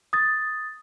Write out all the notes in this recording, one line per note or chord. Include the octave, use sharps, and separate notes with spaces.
D#6 A6